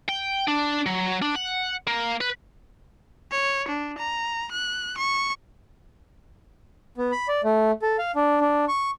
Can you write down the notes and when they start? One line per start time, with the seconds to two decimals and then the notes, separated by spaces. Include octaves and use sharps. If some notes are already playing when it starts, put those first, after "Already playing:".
0.09 G5
0.48 D4
0.86 F#3
1.22 D4
1.35 F#5
1.87 A#3
2.21 B4
3.31 C#5
3.68 D4
3.98 A#5
4.52 F#6
4.98 C#6
6.98 B3
7.12 B5
7.28 D5
7.44 A3
7.82 A4
7.99 F5
8.16 D4
8.41 D4
8.68 C#6